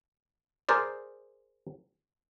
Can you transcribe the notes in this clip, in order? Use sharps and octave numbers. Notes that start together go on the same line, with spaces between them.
G#4 A#4 C5 D5